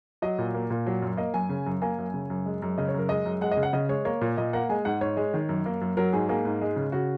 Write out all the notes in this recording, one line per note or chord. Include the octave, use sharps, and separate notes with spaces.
F#3 D#5
A#2
A#3
A#2
F#3
F#2
A#3 D#5
F#2 G#5
C#3
F#2
A#3 G#5
F#2
C#3
F#2
G#3
F#2
C#3 D#5
C#5
F#2 A#4
G#3 D#5
F#2
G#3 F#5
D#5
C#3
F#5
C#3 D#5
G#3 C#5
A#3 C#5
A#2
A#2 D#5
A#3 F#5
G#3 G#5
G#2 F#5
G#2 C#5
G#3
D#3
F#2
A#3
F#2
F#3 A#4
G#2 G#4
A#3 G#4
G#2
G#3
C#3
C#3 F#4